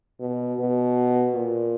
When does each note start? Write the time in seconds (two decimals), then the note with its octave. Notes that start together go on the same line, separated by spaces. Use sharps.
0.20 B2
0.59 B2
1.35 A#2